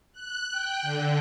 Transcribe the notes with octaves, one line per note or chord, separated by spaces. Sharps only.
F#6
G5
D3